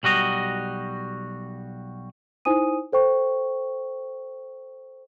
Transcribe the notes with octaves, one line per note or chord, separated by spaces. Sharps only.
B1 G3 F#4 D#5
D#4 E4 C5 G#5 D#6 D#7
A4 C5 G5 C#6